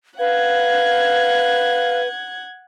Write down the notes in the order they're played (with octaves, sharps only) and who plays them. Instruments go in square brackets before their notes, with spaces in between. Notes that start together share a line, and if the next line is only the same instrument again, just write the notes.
[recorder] B4 [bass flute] F5 [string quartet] F#5 G#6